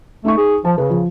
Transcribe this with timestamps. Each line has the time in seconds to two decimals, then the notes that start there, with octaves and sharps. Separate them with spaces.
0.25 A3 D#4 C#6
0.38 G#4
0.65 F3 A5
0.78 C#3 B4
0.90 F3